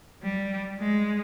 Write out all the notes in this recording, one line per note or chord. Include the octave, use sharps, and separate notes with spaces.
G3
G#3